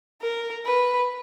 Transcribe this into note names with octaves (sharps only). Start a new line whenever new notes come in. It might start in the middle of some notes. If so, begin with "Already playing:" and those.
A#4
B4